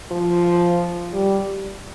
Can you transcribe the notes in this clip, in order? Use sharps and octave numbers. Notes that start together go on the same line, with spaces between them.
F3
G3